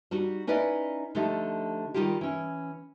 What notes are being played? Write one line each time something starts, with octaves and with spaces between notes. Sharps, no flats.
G3 D#4 F#4
C#4 D#4 E4 B4 D5 D#5
D3 F3 A3 D#4 G4
D#3 F3 G3 D#4 F4 G4
E3 C#4